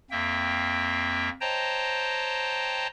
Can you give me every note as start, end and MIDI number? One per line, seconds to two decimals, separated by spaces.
0.11 1.29 41
0.11 1.29 58
0.11 1.29 60
0.11 1.29 76
0.11 1.29 79
1.41 2.87 72
1.41 2.87 73
1.41 2.87 75
1.41 2.87 79
1.41 2.87 81
1.41 2.87 82